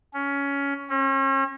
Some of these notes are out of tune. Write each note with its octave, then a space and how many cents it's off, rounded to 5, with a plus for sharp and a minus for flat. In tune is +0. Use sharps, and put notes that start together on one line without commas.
C#4 +15
C#4 -40